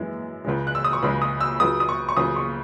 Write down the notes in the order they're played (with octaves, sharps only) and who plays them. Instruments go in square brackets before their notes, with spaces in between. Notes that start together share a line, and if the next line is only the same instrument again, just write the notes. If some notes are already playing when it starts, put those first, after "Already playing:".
Already playing: [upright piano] F#2 E3 G#3
C#2 C#3 G#3
F#6
E6
D#6
C#6
C#2 C#3 G#3 B5
D#6
E6
C#2 C#3 F#3 D#6
D#6
C#6
C#6
C#2 C#3 F#3 D#6
C#6